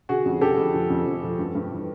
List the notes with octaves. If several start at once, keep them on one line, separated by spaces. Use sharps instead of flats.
D3 F#4 G#4
F2
D3 G4 A4
F2
F3
F2
F2
F3
G2
G2
E3